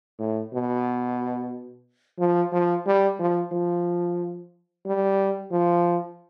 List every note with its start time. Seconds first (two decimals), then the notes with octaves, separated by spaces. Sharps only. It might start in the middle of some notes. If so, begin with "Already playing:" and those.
0.19 A2
0.53 B2
2.19 F3
2.52 F3
2.86 G3
3.19 F3
3.52 F3
4.85 G3
5.51 F3